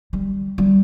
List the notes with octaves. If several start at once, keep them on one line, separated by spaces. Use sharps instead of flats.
G3
G3